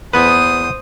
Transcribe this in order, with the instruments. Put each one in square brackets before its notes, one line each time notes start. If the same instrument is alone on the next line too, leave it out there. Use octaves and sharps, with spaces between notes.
[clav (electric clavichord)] E2 B3 B4 [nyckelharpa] C5 D#6